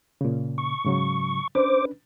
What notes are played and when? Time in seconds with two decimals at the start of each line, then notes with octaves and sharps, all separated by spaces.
0.21 A#2 C#3
0.58 C#6
0.85 G#2 C#3 F#3
1.55 C#4 D4 B4 C5 D6